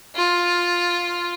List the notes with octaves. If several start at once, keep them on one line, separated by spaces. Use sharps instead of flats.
F4